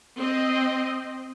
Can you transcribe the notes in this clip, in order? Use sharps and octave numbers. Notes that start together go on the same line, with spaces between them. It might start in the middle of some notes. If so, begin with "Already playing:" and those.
C4 D#5